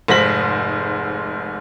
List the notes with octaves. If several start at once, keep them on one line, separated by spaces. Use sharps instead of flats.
F1 G#2 C5 A#6 B6 F#7